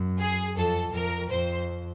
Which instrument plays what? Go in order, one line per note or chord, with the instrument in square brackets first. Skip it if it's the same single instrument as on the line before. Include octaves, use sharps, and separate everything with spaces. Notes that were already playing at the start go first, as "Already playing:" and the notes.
Already playing: [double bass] F#2
[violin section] G#4
[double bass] F2 [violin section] A4
[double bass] F2 [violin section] A#4
[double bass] F2 [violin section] C5